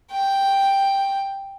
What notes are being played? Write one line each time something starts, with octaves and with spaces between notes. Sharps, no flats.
G5